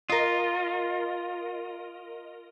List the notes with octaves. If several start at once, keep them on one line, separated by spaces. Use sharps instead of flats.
F4 A#4 D#5